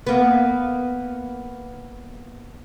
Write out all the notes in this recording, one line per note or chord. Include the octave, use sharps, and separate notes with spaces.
A#3 B3